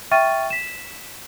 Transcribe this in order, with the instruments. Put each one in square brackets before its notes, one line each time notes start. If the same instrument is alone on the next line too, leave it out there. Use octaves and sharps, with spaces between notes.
[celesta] E5 G5 C#6 F6 A6 D#7
B6 E7